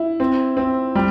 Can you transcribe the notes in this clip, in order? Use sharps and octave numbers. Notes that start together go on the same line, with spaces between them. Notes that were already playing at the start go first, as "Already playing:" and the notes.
Already playing: E4
C4
C4
G3